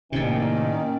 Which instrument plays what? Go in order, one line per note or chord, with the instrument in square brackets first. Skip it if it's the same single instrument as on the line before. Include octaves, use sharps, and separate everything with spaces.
[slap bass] A2 C3 [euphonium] D#3 [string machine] A#3 D5 [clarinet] C#4